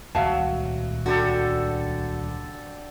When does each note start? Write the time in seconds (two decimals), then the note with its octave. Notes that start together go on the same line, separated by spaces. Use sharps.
0.15 D#1 C#2 A#2 F#3 E5 F5 A5
1.06 D3 F#4 G4 A4